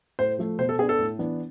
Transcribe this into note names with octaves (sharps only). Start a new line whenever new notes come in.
A2 C5
F3 A3
B2 C5
A4
B3 D4 G#4
A4
A2
E3 B3 D4